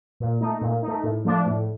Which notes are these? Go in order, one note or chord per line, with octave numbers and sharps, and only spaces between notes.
A#2
A3 D#4
A#2
D#4
A3
A2
F3 A3 D4
A2